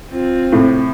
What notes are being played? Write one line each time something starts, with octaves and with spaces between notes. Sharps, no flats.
C4 F4
A2 C3